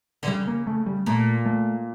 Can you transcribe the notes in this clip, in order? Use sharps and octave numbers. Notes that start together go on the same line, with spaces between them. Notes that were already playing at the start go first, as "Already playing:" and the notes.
D3
C#3 G3
A#3
A3
G3
A#2 A3
A3